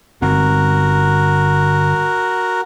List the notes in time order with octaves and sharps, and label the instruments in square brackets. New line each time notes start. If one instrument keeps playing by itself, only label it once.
[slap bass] G1 G2 C4 [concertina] F#4 A#4